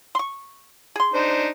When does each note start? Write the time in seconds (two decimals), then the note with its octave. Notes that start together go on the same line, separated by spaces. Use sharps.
0.15 C6 C#6
0.96 G#4 C6
1.14 D4 D#4 C5